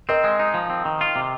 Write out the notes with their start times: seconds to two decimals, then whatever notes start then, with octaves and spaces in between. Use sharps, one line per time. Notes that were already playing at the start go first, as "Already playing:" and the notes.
0.09 C4 A#4 D#5
0.24 G#3
0.39 D#4
0.54 F3
0.70 C4
0.85 D#3
1.01 F4
1.16 C3